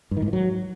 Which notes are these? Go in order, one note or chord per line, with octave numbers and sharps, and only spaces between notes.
G2
D#3
G#2
E3
F#3